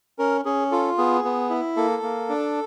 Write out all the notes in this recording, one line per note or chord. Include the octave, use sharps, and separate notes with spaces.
C#4 A#4
C#4 G#4
F4 A4
B3 G#4
B3
E4
A#3 A4
A#3
D4